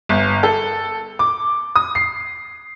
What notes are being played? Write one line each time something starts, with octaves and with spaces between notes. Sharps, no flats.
G1
A4
D6
D#6
C7